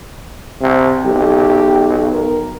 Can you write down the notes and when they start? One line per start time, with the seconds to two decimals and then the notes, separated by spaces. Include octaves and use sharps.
0.61 C3
1.05 B1 G4
2.14 A#4